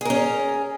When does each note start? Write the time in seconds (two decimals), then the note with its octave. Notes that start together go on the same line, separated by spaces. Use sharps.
0.01 G#4
0.05 A#4
0.10 C#4